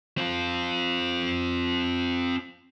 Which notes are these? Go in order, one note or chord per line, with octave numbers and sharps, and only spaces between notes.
C4 F4